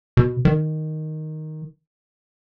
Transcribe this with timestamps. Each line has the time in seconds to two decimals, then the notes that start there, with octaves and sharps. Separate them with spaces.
0.17 B2
0.45 D#3